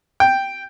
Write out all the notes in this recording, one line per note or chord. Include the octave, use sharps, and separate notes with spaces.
G5